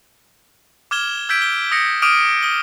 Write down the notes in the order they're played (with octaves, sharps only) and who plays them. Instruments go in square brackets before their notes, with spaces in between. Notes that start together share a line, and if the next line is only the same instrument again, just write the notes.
[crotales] D6 F6 G#6 E7 G7
E6 G6 G#6 B6 D7
G7
D#6 A#6 C#7
D6 D#6 F6 D7 D#7
D#6 G7